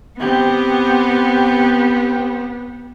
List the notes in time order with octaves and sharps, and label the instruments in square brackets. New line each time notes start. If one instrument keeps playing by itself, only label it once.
[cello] B3 [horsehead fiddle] C4 G4